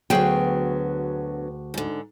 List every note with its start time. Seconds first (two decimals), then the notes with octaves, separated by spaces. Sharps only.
0.10 D2 D3 F#3 B3 G#4 G5
1.74 G#2 D3